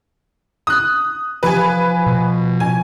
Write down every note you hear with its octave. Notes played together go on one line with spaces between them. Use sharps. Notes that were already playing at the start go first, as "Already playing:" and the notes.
D#6 F#6
F3 B4 G#5
B2
G#5